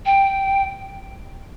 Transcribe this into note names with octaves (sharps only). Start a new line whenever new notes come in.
G5